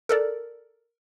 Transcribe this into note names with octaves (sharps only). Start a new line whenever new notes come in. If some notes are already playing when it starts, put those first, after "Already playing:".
A4 A#4 D5